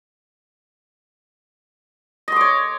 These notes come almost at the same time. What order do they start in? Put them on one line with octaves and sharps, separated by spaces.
D#5 C6 D6 C#5